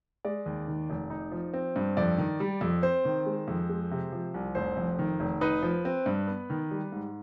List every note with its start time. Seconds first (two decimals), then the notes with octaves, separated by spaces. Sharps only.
0.25 G#3 D5
0.46 D#2
0.68 D#3
0.90 F1
1.10 D#4
1.32 F3
1.54 C4
1.76 G2
1.97 F2 D5
2.18 D#3
2.40 G3
2.61 F2
2.83 C4 C5
3.05 D#3
3.26 G#3
3.48 F2
3.69 G#3
3.91 C3
4.12 F3
4.34 C2
4.55 F1 C5
4.77 F2
4.99 D#3
5.20 F1
5.41 D#4 B4
5.63 F3
5.85 C4
6.06 G2
6.27 B3
6.50 D#3
6.71 G3
6.92 G#2